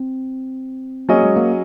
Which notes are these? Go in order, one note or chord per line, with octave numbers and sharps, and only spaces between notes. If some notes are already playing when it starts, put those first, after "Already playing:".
Already playing: C4
F#3 A#3 C#4 G#4 D#5
G#3
A#3